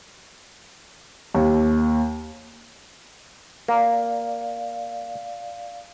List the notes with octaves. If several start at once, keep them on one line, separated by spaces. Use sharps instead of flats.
D#2
A#3 D5 F5